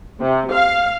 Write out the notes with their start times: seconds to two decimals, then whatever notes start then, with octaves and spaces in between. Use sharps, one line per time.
0.20 C3
0.52 F5